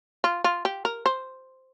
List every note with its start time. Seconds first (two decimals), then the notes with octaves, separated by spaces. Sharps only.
0.24 F4
0.44 F4
0.65 G4
0.85 A#4
1.06 C5